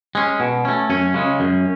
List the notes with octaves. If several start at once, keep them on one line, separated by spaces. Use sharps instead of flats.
G#3 C#4
B2
A3 C#4
F#2 C#4
C#3 G#3
F#2